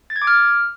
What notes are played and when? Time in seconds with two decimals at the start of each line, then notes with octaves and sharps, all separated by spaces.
0.10 A6
0.16 G#6
0.22 D6
0.27 F6